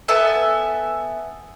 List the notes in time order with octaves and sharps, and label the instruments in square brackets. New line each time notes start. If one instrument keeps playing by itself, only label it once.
[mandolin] B3 A4 E5 G#5